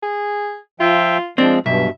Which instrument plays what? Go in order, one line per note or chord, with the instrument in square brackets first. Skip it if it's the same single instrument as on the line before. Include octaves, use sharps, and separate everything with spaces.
[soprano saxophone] G#4
[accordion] F3 E5 G5 [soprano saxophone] F4
[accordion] F3 G#3 [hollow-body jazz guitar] C4 [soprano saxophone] D4
[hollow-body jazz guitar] B1 [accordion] G2 B2 [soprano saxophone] E5